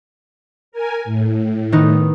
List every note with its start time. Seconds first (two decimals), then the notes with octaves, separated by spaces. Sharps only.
0.72 A#4 G#5
1.05 A2
1.72 D#3 B3 D#4